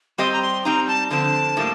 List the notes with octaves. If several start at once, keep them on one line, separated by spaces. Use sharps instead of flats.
G3 C4 G4 C5 D#5 C6
A#5
C6
G3 C4 D#4 A#5
A5
D3 F3 C4 A5
A2 G3 A#3